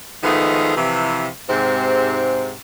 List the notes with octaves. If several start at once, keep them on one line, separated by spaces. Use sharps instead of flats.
D#3 F3 G#3 A3 B3 D#4
C3 E3 F3
G#2 C3 C4